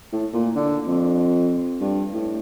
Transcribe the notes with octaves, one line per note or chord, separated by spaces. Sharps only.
A2
A#2
D3
F2
G2
A2